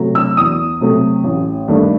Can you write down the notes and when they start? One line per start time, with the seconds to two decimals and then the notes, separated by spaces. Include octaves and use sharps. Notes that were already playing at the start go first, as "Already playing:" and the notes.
Already playing: C3 F#3 A3
0.15 E6
0.37 E2 D#6
0.81 C3 F#3 A3
1.24 A1
1.68 G2 D#3 A3